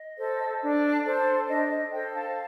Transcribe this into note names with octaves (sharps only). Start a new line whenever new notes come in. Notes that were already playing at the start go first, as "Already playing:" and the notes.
Already playing: D#5
A4 C5
D4
A4 C5
D4 D#5
D#5
A4 C5 D#5 G5
F5 A5